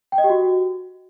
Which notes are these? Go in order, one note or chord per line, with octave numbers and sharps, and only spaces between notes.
G5
D#5
G4
F#4